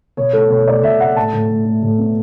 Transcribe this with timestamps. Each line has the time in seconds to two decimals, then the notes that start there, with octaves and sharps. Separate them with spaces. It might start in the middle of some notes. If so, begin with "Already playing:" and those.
0.17 B2 C#5
0.33 A3 A4
0.50 B2 C#5
0.67 A3 D5
0.83 B2 E5
1.00 A3 F#5
1.16 A2 A5
1.33 A2
1.49 A2
1.65 A2
1.83 A2
1.98 B3